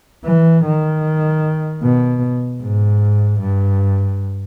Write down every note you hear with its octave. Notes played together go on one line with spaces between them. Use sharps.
E3
D#3
B2
G#2
G2